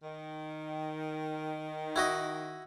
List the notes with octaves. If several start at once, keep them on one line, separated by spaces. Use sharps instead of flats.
D#3
E4 F#4 D#5